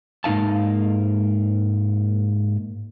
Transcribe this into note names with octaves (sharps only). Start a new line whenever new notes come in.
G#2 A#3 D#4 F5 A5